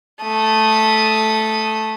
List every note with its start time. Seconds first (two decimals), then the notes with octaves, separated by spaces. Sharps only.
0.22 A3 D#6